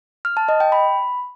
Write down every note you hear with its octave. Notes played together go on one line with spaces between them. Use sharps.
F6
A5
D#5
G5
B5